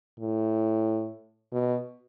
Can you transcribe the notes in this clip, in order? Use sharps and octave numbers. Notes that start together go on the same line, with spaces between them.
A2
B2